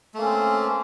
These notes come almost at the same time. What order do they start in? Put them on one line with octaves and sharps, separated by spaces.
A3 A#3 C#4 C4